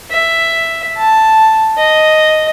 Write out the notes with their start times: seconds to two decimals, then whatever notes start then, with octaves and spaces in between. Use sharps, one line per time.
0.11 E5
0.98 A5
1.78 D#5